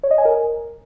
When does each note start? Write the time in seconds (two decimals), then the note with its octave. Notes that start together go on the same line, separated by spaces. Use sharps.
0.03 C#5
0.11 D#5
0.18 G#5
0.25 A#4